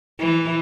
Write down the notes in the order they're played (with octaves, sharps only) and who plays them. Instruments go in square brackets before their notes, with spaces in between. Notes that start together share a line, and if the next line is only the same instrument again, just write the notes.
[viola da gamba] E3